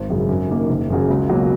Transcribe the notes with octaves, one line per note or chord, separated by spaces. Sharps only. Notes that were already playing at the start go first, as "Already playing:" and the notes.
Already playing: G#1
F#2 C#3 F#3
F#2
D#3 A#3
F#1
F#2 C#3 F#3
C#2
B2 F#3 A#3 C#4